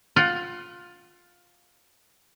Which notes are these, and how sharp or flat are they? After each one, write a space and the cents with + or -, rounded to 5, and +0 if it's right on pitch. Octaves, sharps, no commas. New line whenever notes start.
F4 +15 F#5 +40